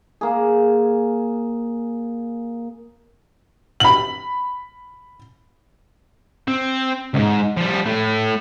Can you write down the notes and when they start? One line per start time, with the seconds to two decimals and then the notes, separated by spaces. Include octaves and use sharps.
0.21 A#3 G#4
3.80 B5 F#7
6.48 C4
7.14 C#2 G#2
7.57 F3 G3
7.86 A2 A3